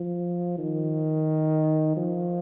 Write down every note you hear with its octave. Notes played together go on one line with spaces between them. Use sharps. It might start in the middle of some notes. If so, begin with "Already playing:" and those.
Already playing: F3
D#3
F3